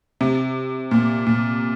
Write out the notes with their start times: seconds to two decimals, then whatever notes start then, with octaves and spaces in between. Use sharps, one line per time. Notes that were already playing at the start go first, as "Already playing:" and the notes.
0.21 C3
0.91 A#2
1.27 A#2